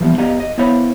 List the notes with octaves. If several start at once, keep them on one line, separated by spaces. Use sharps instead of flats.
E3 F3 G3 B3
B3 G4 D5 D#5 F5 A#5
D#5
B3 E4 C5 C#5 F5 B5